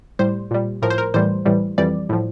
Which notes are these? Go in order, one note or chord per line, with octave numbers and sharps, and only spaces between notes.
A2 G3 C5
A#2 G3
A2 F3 A#4
C5
A#4
A2 E3 G3 C5
A2 E3 G3
F2 E3 G3 D5
A2 F3